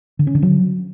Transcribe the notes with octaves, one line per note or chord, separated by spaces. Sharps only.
D3
C#4
D3
F#3